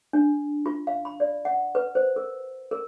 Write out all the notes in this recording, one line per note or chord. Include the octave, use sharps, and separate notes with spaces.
D4
F4
F5
B5
D5
F#5
B4
C5
A#4
A#4